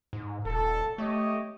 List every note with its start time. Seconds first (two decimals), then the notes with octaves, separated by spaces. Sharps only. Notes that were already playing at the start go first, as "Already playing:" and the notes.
0.13 G#2
0.45 D#1 A4
0.98 A3 G4 C#5 D#5